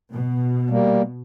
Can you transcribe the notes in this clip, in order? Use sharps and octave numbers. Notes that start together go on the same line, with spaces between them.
B2
G3 A#3